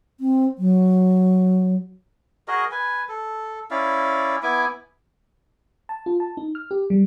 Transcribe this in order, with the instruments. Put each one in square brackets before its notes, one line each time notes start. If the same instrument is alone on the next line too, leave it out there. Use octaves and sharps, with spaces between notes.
[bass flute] C4
F#3
[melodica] F#4 G#4 A#4 D#5
B4 G#5
A4
C#4 E4 D5 F5
B3 E4 G#5 D6
[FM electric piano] A5
F4
A5
D#4
F6
G4
G3